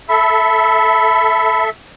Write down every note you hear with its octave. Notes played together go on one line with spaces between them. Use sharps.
A4 E5 B5